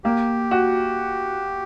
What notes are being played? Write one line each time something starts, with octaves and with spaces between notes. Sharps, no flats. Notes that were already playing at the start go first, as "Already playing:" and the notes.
A#3 G4
F#4